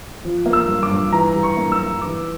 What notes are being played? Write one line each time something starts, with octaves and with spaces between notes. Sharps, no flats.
F3
A#3
E6
G2
D6
G2
E3 A#5
G3
C#6
A#3
E6
G2
E3 D6